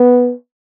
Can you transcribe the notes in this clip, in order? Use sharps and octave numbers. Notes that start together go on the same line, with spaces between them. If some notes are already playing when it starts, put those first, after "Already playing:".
Already playing: B3